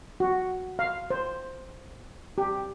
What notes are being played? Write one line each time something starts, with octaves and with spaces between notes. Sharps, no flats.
F#4
F5
C5
G4